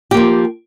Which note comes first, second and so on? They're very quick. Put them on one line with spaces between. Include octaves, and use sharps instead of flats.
G4 A#3 F3